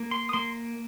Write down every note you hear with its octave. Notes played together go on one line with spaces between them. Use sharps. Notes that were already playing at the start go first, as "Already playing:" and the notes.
Already playing: A#3
C6
D#6
A#3 C6